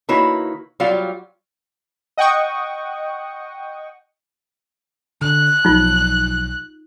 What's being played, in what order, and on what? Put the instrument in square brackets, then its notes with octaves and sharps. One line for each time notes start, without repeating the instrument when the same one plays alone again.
[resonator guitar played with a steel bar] D#3 A#3 E4 F#4 B4 C#5
F#3 G3 F4 D5 F5
[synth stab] D#5 F#5 G5 C#6 D#6
[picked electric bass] D3 [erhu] F#6
[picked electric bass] B1 F3 F#3 [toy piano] D#4 F4